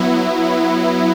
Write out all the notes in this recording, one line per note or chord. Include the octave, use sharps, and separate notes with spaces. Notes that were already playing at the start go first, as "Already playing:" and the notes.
Already playing: F#3 B3 E4